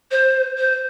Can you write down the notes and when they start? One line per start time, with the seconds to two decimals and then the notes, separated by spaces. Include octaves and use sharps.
0.11 C5
0.57 C5